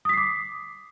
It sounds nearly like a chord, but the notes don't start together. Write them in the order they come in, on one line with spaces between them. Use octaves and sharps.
D#6 B6 C7 D6